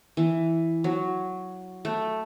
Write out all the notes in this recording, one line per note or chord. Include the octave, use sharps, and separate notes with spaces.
E3
F#3
A3